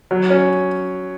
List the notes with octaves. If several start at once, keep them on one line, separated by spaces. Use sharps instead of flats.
F#3
C#4